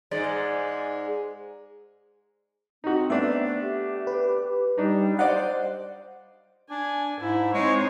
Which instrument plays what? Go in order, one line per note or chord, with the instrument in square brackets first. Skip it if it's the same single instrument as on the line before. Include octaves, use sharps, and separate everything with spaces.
[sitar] G#2 G#3 D5
[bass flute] C4 [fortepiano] D#4 F#4
[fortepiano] A3 B3 D4 [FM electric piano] E5
[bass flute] G4
[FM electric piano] B4
[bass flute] G3 [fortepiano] D4 D#4
[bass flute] C5 [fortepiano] D5 D#5 F5 [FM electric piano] F#5
[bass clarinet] D4 [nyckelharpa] G#5
[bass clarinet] G#2 [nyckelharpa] E4
[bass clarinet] G#3 [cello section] C4 D#4 C5 [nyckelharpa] C#5